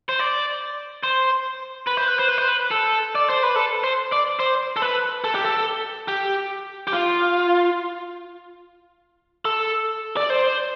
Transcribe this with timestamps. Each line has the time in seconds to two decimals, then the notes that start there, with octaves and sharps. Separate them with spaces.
0.09 C5
0.19 D5
1.03 C5
1.87 B4
1.97 C5
2.08 B4
2.18 C5
2.28 B4
2.38 C5
2.48 B4
2.71 A4
3.15 D5
3.29 C5
3.43 B4
3.56 A4
3.84 C5
4.12 D5
4.39 C5
4.76 A4
4.82 B4
5.24 A4
5.35 G4
5.45 A4
6.08 G4
6.87 G4
6.93 F4
9.45 A4
10.17 D5
10.30 C5